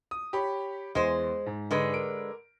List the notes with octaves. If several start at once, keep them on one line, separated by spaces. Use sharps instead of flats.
D#6
G4 C#5 B5
E2 G#3 C5
G#2
D3 G#3 B4
A#4 D7